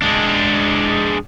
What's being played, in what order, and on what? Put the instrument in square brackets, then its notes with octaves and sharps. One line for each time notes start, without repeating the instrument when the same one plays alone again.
[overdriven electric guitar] G#3 D4